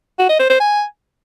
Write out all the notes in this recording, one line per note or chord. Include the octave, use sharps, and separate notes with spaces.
F#4
D#5
C5
C5
G#5